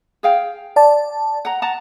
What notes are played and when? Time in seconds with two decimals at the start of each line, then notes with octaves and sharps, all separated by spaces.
0.23 G#4 F5 G5
0.76 D5 A5
1.45 F#5 A#5
1.62 F#5 A5 A#5